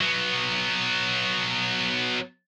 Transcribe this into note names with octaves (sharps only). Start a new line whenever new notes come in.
F#3 B3